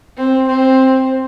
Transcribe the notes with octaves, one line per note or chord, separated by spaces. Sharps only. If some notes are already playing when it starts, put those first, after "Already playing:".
C4
C4